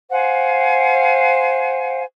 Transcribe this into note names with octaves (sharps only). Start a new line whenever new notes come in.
C5 F5 F#5 G#5